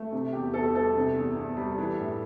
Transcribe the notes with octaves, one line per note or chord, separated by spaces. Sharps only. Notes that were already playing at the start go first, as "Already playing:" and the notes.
Already playing: A3
C3
E2 G4
E2 A4
G3 A4
C3
E2
E2
G3
E3
A2